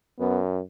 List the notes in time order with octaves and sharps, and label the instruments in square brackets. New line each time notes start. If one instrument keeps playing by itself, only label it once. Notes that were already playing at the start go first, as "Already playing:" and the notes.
[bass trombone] F#2 [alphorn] B3